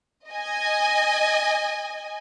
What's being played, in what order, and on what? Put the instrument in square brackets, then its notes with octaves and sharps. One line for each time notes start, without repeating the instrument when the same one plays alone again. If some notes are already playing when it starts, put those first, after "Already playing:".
[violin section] D#5 G#5